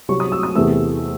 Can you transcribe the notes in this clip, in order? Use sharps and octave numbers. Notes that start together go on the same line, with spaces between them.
C2 C3 F#3 C#6
D#6
E6
D#6
E2 C3 E3 A3 E6